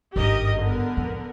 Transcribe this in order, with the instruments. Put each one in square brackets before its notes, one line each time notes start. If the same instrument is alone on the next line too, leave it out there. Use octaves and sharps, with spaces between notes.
[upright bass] G#1 G2 [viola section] G4 A#4 D#5
[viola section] D3 B3 A#4
[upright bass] F2 A2